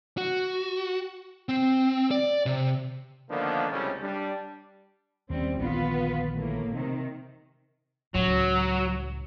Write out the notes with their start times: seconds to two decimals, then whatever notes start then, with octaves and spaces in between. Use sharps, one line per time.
0.17 F#4
1.49 C4
2.11 D5
2.46 C3
3.30 D3 D#3 F3 A#3 B3 D4
3.70 C#2 A2 C3 G3 C#4
4.02 G3 D4
5.30 D#2 G3 C4 C#4
5.60 A#1 D3 D#3 B3 F4 B4
6.37 A2 A#3
6.75 C3 D#3
8.14 C#2 A2 F#3